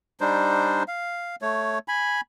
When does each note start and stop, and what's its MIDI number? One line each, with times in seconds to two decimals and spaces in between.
0.21 0.83 55
0.21 0.83 62
0.21 0.83 63
0.21 0.83 72
0.88 1.36 77
1.42 1.79 57
1.42 1.79 73
1.88 2.21 80
1.88 2.21 83